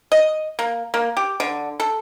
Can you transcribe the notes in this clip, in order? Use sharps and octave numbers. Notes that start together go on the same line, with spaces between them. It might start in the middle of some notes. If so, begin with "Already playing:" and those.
D#5
A#3
A#3
G4
D3
A4